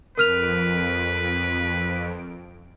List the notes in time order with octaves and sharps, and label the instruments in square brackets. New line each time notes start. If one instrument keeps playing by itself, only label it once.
[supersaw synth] F2 D7 [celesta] A#4 F6 F7 [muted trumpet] B4